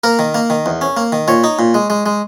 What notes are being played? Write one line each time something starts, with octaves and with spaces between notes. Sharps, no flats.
A#3 A#4
D#3
A#3
D#3
E2
C#4
A#3
D#3
A#2 C#5
D#4
A#2
G#3
G#3
G#3